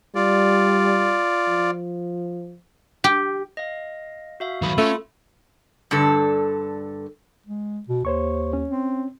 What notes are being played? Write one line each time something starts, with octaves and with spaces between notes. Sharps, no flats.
G3 F4 D5
F3
G4
D#5 F5
F#4 E5 F5
D#3 F#3 F5 B5 D#6
A3 C#4 F4
G2 D3 A4
G#3
B2
D#2 C5 C#5 C#6
C#4
C4